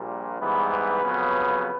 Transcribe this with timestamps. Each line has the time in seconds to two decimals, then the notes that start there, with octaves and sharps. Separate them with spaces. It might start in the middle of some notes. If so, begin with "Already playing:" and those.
Already playing: A#1 A#2 G3
0.40 G#2 E3 G3 B3 B4
0.72 B4
1.04 F2 C#3 F#3 B3